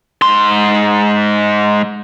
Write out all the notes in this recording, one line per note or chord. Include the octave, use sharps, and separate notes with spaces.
G#2 C6